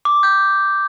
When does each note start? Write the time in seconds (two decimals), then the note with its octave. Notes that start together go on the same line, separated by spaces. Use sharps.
0.05 D6
0.23 G6